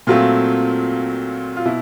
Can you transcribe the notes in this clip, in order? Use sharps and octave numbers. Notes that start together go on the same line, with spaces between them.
A#2 F#3 A3 C4 F4
F4
B2 E4